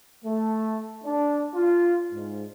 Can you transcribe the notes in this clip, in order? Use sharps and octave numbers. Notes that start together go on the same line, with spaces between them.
A3
D4
F4
G#2